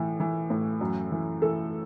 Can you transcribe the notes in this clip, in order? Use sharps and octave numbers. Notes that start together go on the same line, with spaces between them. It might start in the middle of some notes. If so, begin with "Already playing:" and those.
Already playing: A2 E3
E3
A2
F#2
E3
E3 A4